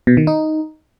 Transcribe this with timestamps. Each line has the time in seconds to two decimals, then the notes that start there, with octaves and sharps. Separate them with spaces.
0.07 B2
0.17 D#3
0.27 D#4